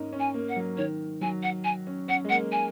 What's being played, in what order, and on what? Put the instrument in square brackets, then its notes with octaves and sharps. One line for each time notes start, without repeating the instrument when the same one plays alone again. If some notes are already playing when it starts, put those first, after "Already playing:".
Already playing: [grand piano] G#2 A#3 C#4 D#4
C#4
[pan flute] G#5
[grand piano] A#3
[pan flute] F#5
[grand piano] F#3
[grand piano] D#3 [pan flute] C#5
[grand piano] F#3 [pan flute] G#5
[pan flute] F#5
G#5
[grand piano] C#4
[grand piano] C#4 [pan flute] F#5
[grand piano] G#3
[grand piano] A#3 [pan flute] F#5
[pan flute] G#5